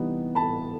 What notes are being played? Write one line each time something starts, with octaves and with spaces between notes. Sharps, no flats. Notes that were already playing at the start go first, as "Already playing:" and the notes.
Already playing: C3 E3 G3 B3 D#4
A5 B5